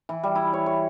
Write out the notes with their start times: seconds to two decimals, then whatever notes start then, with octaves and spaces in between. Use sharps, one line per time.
0.09 E3
0.24 G3
0.35 E4
0.53 C#5
0.66 C#5